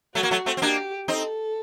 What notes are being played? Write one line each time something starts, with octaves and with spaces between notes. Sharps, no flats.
F#3 A3 F#4
A#3
F#3 A3
A3 C4
C4
A#3 D4 G4
C4 D#4 A4